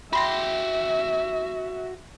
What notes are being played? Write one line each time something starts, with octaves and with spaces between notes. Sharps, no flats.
F#4 E5 G5 B5 C6 A#6